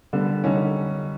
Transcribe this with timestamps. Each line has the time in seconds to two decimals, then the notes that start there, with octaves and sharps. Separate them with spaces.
0.13 D3 G3 B3
0.44 D3 G3 C#4 D#4